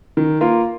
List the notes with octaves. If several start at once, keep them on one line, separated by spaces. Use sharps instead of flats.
D#3
A#3 F4 A#4